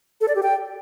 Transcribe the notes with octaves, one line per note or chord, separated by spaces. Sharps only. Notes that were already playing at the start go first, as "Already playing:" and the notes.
A4
D5
G4
G5